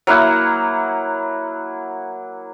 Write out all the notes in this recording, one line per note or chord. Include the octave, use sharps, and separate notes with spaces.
F#3 A#3 E4 F#5